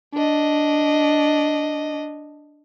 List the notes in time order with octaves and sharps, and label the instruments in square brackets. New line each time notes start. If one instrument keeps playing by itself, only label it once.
[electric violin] D4 D#5